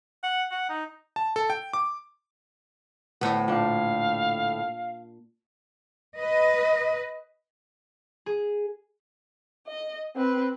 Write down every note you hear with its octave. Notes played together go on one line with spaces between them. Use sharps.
F#5
F#5
D#4
A5
A4
G5
D6
D2 A2 B3
A#2 D4 F5
B4 D#5
G#4
D#5
C4 B4